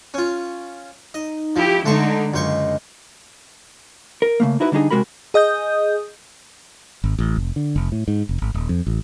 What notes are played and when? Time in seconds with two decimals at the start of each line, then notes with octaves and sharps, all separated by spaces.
0.14 C#4 F4
1.14 D#4 D#5
1.56 F3 E4 G4
1.85 D3 G#3 A3 D#4 C6 C#6
2.34 C#2 F#2 C5 D#5 C#6
4.22 A#4
4.40 C#3 A3 A#3
4.60 D#4 E4 F#4 B4
4.72 D3 G3 D4 D#4 G#4
4.91 C3 G#3 F#4 A#4 B5
5.34 G#4 D#5 D#6 G6
7.04 G#1
7.19 A1
7.36 F1
7.56 D3
7.76 F1
7.92 A2
8.08 G#2
8.29 F1
8.42 G#1
8.54 D#1
8.69 F2
8.87 A1